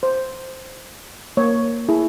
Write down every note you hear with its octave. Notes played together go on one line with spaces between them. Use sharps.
C5
A#3 C#5
E4 G#4